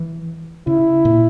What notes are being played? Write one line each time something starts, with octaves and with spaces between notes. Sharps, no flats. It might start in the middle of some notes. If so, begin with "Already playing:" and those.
Already playing: E3
C#3 E4
A#2